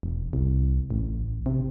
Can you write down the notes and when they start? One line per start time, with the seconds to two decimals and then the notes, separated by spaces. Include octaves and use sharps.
0.03 E1
0.33 C2
0.90 A1
1.46 C3